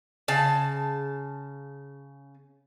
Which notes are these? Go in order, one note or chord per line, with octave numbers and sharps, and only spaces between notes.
C#3 A5